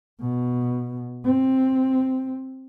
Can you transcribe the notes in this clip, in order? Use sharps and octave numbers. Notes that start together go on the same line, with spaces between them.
B2
C4